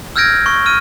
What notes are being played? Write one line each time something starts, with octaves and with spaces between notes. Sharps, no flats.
E6 F6 G6 G#6 A#6 D7
C#6
F6 D#7